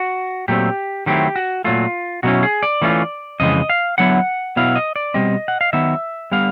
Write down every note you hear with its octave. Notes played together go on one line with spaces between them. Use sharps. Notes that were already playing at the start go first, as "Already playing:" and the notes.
Already playing: F#4
A#2 F#3 A3 C4 G4
D#3 F#3 A3 C4 E4 G4
F#4
A#2 F#3 A3 F4
B2 F#3 A#3 C#4 E4 F#4
G#4
D5
E3 A3 C#4 F4
F2 C#3 E3 G#3 D#5
F5
D3 F#3 B3 E4 F#5
B2 F#3 B3 E4 F5
D#5
D5
B2 G3 C4 D#5
F#5
F5
D#3 F#3 B3 E5
D3 G3 B3 F5